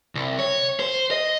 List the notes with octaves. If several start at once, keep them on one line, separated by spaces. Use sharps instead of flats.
C2
C#5
C5
D#5